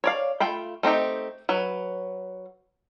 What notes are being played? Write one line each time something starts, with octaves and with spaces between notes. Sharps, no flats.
C#5 D5 F5
A3 F4 G5 B5
A3 C4 D#4 G4
F#3 B4